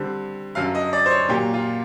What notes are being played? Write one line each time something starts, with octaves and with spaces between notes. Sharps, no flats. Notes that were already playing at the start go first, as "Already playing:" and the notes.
Already playing: D3 G3 C4
F#2 D3 F#3 F5
D#5
D5
C5
C#5
A#2 F#3 A#3 G4
F4